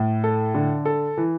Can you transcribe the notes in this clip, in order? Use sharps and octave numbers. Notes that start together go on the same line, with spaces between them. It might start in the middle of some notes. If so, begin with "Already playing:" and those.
Already playing: A2
A4
D3
A4
E3